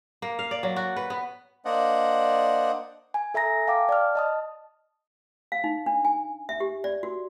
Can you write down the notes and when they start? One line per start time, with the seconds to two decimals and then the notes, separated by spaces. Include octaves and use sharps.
0.22 A#3
0.39 F5
0.51 D5
0.63 F#3
0.76 F#4
0.96 B4
1.10 B3
1.65 A#3 D4 C5 D5 D#5 F#5
3.14 G#5
3.34 A4 E5 G#5 A#5 A#6
3.68 F5 G5 A5 D6
3.89 D5 A5 F6
4.15 D#5 A5 D#6
5.52 F5
5.64 D#4
5.86 D4
6.05 G#5
6.49 E5
6.60 G4
6.84 D5
7.03 F#4